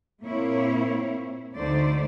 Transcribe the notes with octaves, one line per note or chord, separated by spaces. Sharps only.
A#2 A#3 C4 E4 C#5
D2 D3 A3 D#4 C5 D5